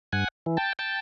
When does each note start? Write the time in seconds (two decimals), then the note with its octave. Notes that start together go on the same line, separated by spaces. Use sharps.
0.13 G2 F#5 G#5
0.46 E3
0.57 G5 A5
0.79 G5 A5